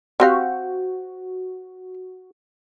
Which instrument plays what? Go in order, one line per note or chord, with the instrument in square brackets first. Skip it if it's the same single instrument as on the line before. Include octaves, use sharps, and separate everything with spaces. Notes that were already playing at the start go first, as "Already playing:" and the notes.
[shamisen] C4 G4 F5 [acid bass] F#4